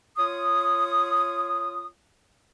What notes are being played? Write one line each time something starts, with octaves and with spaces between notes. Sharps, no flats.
F4 C#5 D#6